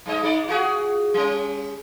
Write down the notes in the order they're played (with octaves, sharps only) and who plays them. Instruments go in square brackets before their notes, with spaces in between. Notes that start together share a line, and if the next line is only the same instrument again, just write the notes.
[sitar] G2 G#3 D#5
G#3 D#4 D5
F4 F#4 G#4
G3 C#4